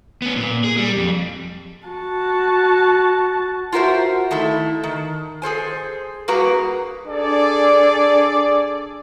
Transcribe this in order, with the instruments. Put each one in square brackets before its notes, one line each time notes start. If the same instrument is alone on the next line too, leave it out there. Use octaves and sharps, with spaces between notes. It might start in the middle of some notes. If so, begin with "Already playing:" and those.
[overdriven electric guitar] B3 C#4
A#2
G#4
G3
F2
[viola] F#4 A5
[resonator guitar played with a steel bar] F4 F#4 A#4 C5 E5
D#3 A3 E4 E5
D#3
G#4 A4 C5 G#5
G2 A#3 F#4 G#4 B4 A#5
[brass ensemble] D4 G#4 A4 D5